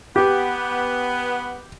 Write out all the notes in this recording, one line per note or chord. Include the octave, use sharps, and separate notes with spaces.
B3 G4